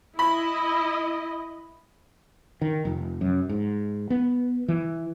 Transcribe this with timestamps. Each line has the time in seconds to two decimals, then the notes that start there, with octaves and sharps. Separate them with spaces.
0.19 E4 D#5 B5
2.62 D#3
2.85 F1
3.21 F#2
3.49 G#2
4.10 B3
4.68 E3